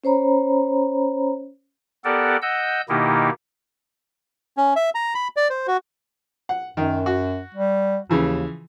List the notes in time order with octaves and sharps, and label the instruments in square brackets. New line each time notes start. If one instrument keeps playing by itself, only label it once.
[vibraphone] C#4 C5 C#5 A#5 B5
[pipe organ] B3 G4 A4 A#4 D5 F#5
D#5 F#5 E6 G6
B2 D#3 A#3 D#4 E4 G4
[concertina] C#4
E5
A#5
B5
D5
C5
F#4
[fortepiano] F#5
[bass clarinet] F#2 [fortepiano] D#3
[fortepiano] F#4
[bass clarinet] G3
[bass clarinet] D#2 [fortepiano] C#3 E3 F3